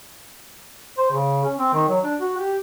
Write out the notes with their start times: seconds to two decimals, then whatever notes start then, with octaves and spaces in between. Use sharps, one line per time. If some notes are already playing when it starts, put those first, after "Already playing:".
0.98 C5
1.11 C#3
1.44 C#4
1.57 C4
1.73 D#3
1.88 F#3
2.03 D4
2.19 F#4
2.37 G4